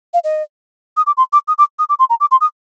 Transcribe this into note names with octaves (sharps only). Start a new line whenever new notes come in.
F5
D#5
D#6
D6
C6
D6
D#6
D6
D#6
D6
C6
A#5
D6
C6
D#6